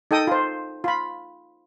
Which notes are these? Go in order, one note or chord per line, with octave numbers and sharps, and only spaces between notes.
D#4 A4 D#5 G5 D#6
F4 C5
F4 B5